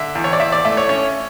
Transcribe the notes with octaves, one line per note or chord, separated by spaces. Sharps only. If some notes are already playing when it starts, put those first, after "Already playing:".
Already playing: D3 E5
E2
C#5
D5
E2 E5
D5
A3 E5
C#5
C#4 C#5